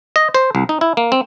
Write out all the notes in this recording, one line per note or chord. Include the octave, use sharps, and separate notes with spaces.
D#5
C5
C2
D#4
E4
A#3
C4